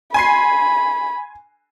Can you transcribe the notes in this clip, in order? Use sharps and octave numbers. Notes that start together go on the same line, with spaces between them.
G#5 B5 C6 C7